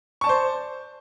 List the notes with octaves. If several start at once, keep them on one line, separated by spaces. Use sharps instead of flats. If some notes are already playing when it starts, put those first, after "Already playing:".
C5 D5 A5 C#6